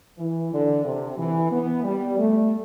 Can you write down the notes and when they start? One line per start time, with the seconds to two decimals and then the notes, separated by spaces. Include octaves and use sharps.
0.18 E3
0.52 D3
0.85 C3
1.18 E3
1.52 B3
1.84 G3
2.18 A3